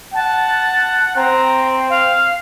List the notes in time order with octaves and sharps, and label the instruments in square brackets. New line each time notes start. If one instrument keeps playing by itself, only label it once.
[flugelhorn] F#5 [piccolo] A5
[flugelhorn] C4 [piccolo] A#5
[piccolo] F5